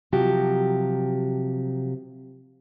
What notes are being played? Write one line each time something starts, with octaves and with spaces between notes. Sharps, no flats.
C3 F3 F#3 F#4 G4